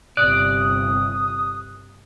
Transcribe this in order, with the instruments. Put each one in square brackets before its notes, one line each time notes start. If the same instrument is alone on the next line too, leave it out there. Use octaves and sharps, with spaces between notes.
[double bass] G1 C3 [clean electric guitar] D5 [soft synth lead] D#6 [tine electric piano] F#6